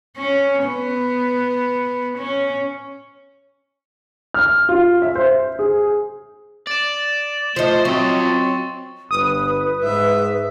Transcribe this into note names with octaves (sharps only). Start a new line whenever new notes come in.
C#4
B3
C#4
F6
F4
E5
C5
G#4
D5 A6 E7
F3 A3 D#4 C5
F#3 C4 F4 D#5 C#6 A6
G1 B4 D#6
G#2 E5